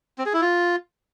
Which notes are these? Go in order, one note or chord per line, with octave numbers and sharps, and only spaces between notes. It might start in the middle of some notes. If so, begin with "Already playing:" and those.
C4
G#4
E4
F4